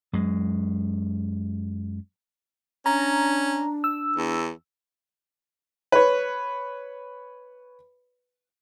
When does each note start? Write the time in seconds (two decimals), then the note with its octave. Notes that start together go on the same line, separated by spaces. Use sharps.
0.13 F#2 G#3
2.86 C#4 D4 A#5
3.84 E6
4.16 E2
5.92 B4 C#5